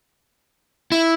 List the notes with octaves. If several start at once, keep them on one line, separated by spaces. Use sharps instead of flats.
E4